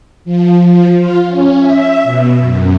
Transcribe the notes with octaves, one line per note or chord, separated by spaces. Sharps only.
F3
F3
F4
C#4
E5
B2
F#2